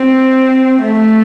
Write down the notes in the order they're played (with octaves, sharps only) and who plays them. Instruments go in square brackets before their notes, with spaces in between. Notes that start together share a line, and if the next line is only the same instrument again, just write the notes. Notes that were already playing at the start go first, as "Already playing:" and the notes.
Already playing: [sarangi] C4
A3